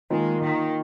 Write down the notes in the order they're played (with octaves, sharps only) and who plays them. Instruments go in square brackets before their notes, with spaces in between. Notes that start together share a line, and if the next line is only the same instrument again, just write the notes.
[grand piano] D#3 A#3 F4 [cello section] G#3
[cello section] D#3